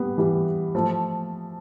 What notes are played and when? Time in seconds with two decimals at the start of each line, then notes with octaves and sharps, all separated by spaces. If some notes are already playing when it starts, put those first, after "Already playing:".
Already playing: G3 B3
0.18 E3 G3
0.75 F3 A3